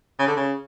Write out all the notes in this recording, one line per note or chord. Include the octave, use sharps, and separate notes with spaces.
C#3
D3
C#3